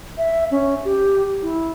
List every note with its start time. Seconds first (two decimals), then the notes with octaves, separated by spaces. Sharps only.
0.18 E5
0.51 C#4
0.85 G4
1.42 E4